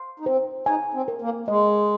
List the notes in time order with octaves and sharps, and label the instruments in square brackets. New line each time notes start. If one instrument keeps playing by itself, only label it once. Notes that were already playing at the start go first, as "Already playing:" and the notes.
Already playing: [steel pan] C6
[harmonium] D#4
[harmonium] C4 [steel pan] C5
[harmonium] D#4 [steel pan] G#5
[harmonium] C4
[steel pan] A#4
[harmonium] A#3
[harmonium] G#3 [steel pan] D#5